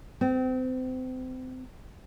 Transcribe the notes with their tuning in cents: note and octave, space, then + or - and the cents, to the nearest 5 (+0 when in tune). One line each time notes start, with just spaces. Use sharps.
C4 -30